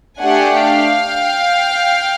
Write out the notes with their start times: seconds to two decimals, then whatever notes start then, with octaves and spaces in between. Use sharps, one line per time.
0.22 A3 D4 G4 F#5 G#5
0.64 F5 G5